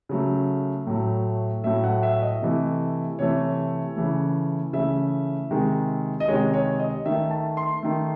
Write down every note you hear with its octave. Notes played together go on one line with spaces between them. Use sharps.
C#3 F#3 A3
A2 F#3 A3
A2 F#3 A3 E5
F#5
E5
D#5
C3 E3 A3
C3 E3 A3 C#5
C#3 E3 A3
C#3 E3 A3 E5
C3 D#3 G#3
D#5
C3 D#3 G#3 C#5
C#5
D#5
D#3 A3 E5
A5
C6
D#3 A3